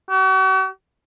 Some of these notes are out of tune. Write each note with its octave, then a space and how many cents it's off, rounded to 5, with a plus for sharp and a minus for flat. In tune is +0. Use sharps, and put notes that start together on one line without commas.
F#4 +45